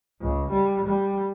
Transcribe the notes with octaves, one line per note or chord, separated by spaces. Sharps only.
C#2
G3
G3